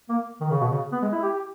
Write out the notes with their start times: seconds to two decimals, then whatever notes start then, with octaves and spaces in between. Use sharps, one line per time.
0.09 A#3
0.41 D#3
0.51 C#3
0.61 B2
0.71 C#3
0.92 B3
1.02 G#3
1.12 E4
1.22 G4
1.33 G4